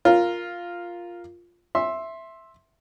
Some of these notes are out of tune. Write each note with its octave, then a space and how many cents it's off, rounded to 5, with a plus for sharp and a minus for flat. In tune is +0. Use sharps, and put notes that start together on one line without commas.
F4 +0 A#4 +0
E5 +0 C6 +15